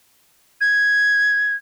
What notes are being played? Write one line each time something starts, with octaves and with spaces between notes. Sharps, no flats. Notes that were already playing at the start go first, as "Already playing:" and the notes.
G#6